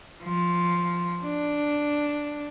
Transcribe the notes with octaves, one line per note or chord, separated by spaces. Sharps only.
F3
D4